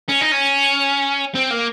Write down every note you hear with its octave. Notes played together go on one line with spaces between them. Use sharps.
C#4
D#4
C#4
C4
A#3